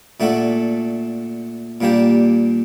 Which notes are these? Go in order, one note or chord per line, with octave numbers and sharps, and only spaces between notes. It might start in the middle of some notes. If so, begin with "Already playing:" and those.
A#2 A3 D4 F#4 A4
A#2 G3 A#3 D4 G4